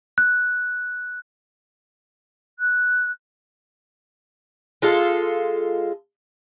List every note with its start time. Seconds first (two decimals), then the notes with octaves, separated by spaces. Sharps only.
0.18 F#6
2.59 F#6
4.82 G#3 F4 A4